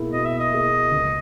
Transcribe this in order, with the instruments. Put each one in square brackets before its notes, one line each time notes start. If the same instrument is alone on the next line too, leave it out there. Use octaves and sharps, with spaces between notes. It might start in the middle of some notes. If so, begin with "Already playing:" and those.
Already playing: [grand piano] B2 A#3 E4 G#4
[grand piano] B2 [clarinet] D#5
[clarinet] E5
D#5
[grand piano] A#3 E4 G#4
C#2